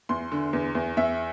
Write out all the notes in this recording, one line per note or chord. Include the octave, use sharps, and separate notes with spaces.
E2 C6
D3
E2
E2
E2 E5